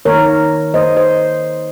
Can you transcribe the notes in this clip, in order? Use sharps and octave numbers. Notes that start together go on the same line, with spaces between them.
D#3 A#3 A#4 C#5
D#3 A#3 C5 D#5
C5 D#5